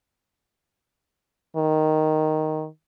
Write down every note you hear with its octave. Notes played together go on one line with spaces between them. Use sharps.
D#3